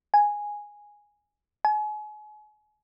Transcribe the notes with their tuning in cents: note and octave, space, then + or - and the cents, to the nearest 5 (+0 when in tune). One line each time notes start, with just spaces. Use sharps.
G#5 -5
G#5 +35